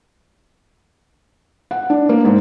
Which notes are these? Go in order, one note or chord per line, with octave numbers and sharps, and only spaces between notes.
F#5
D4
A#3
G#2